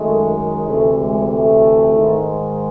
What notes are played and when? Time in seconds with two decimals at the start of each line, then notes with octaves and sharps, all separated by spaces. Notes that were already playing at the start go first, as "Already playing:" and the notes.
Already playing: F#2 D#3 G#3 A3
0.65 D2 C3 E3 A3
0.98 G#3
1.30 A3
1.95 G#2 D#3 G#3